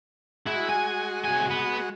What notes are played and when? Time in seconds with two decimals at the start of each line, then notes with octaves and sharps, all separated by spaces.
0.46 G#3 E4 F#4
0.69 G#5
1.24 C2 G#5
1.50 B3